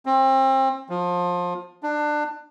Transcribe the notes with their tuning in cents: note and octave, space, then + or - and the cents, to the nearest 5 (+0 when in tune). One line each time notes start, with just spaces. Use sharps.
C4 +30
F3 +25
D4 +20